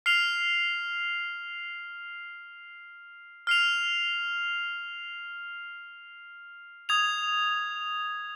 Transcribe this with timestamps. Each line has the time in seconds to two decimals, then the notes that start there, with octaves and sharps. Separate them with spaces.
0.06 F6 C7 F7
3.47 F6 C7 F7
6.89 D#6 G#6 F7